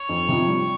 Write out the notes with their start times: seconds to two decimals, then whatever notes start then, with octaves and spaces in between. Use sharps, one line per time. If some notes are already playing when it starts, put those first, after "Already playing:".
Already playing: C#5
0.09 F2
0.29 C3 F3
0.48 G3